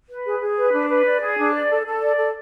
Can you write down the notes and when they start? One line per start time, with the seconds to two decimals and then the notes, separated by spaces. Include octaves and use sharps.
0.09 B4
0.26 G#4
0.41 G#4
0.58 B4
0.73 D4
0.90 B4
1.06 D5
1.22 G#4
1.38 D4
1.53 D5
1.70 A4
1.86 A4
2.02 D5
2.18 A4